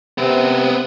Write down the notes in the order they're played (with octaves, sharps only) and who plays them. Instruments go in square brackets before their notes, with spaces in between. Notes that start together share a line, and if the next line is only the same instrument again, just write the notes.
[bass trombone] C3 [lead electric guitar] B3 C4